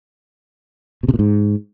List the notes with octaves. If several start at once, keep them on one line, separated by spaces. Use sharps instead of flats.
B2
C3
A#2
G#2